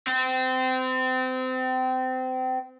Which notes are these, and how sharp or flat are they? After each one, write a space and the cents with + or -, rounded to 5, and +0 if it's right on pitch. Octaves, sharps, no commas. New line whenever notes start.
C4 -25